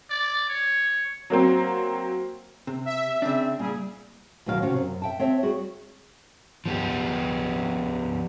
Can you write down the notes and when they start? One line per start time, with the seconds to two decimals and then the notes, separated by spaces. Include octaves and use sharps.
0.10 D5
0.49 C#5
1.30 F#3 A#3 C4
2.67 C3
2.85 E5
3.22 C#3 C4 D4
3.59 A#2 G3 G#4
4.46 D2 B2 D#3 F#3 F#4 F5
4.62 C3 C#4 F#4
4.77 F#2
5.02 E5 G5 A5
5.19 C4 C#5 E5
5.43 G3 F#4 G#4
6.66 F3 B3 G4